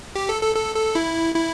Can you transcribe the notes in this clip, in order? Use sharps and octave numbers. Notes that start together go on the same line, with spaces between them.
G4
A4
A4
A4
A4
E4
E4